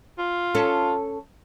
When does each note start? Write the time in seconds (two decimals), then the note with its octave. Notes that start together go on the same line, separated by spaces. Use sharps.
0.18 F4
0.55 C#4 A4